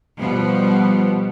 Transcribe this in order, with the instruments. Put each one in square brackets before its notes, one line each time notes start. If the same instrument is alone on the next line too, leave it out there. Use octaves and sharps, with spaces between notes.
[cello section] B2 F3 G3 B3